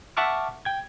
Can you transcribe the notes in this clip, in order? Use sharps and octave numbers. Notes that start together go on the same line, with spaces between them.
E5 F#5 A5 C#6 D6 F6
G5 G#6